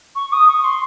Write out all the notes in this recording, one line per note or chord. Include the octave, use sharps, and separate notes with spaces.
C#6
D#6
C#6
C6